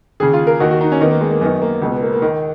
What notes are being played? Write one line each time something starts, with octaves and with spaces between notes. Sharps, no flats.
D#2 C#3 G#4
F4
A#4
D#2 D#3 F#4
F#4
D#4
C#4
D#2 D#3 B3
A#3
G#3
A#3
F#2 D#3 B3
A#3
C#2 B2
B3
A#3
A#3
D#2 D#3